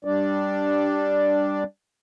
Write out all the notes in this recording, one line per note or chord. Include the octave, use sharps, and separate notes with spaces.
G3 D4 D5